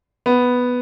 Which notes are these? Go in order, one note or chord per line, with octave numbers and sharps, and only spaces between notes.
B3